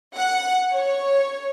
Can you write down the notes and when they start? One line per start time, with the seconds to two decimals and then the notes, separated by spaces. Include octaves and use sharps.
0.16 F#5
0.72 C#5